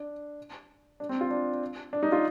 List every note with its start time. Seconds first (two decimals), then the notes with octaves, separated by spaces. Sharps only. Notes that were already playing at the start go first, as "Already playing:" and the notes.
Already playing: D4
1.00 D4
1.09 C4
1.21 F4
1.31 D4
1.93 D4
2.03 D#4
2.12 F4